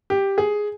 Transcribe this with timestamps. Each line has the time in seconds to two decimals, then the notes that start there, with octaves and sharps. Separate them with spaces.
0.10 G4
0.38 G#4